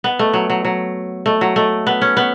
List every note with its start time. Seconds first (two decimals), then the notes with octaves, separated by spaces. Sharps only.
0.04 B3
0.19 A3
0.33 F#3
0.50 F#3
0.65 F#3
1.26 A3
1.41 F#3
1.56 A3
1.87 B3
2.02 C#4
2.17 B3